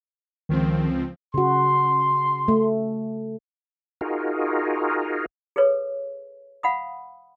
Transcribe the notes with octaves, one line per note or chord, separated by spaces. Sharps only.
C#2 D#3 F3 C4
C#3 F#4 C6
A3
D#4 F4 F#4 G#4 A#4
G#4 A4 B4 C#5
F5 F#5 B5 D#6